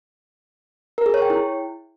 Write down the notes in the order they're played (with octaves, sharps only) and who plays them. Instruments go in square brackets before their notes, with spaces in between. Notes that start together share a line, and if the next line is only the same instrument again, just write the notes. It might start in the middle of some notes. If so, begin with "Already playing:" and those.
[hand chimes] A#4
G#4
C#5
G5
E4